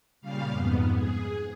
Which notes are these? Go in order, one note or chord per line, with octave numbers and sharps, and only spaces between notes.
A#2 C#3 G3 F5
F2 G#2 B3
G#4